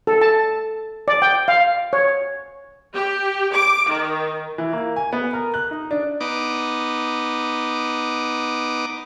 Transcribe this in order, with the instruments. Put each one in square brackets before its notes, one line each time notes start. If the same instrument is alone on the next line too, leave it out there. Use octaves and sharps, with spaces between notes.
[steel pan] A4
A5
D5
G5
F5
C#5
[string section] G4
D6
D#3
[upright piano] E3
A#3
G#5
B3
A#4
F#6
D#4
D4
[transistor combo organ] B3 D#4 D6